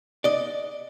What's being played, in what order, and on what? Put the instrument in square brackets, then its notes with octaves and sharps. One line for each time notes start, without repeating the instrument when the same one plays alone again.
[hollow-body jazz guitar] D5 D#5